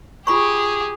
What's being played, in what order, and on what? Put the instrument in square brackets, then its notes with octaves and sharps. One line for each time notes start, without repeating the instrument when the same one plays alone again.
[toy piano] F4 B5 C#6 [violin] G4 G#4